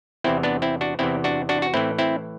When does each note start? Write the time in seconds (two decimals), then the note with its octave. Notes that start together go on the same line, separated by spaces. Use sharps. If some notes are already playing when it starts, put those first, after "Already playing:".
0.24 E2 C3 E3 C4 E4
0.43 B3 D4
0.62 C4 E4
0.81 D4 F#4
0.99 E2 C3 E3 C4 E4
1.24 D4 F#4
1.49 D4 F#4
1.62 F#4
1.74 A2 E3 C4 E4
1.99 C4 E4